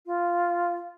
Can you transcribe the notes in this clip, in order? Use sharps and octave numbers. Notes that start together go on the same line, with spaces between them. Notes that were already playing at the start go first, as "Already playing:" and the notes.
F4